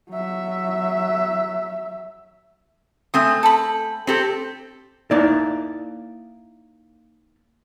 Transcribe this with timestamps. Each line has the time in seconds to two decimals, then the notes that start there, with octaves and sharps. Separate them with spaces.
0.10 F#3 E5
3.14 A3 C4 G#5 D#6
3.43 A4 B5
4.07 C4 G4 A4
5.11 A#3 D#4 E4 D5